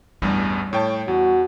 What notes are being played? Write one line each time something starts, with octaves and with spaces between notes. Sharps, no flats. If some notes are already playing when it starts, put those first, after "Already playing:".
A1 E2 G2 G3
A2 C#5 G5 A5
E2 F#4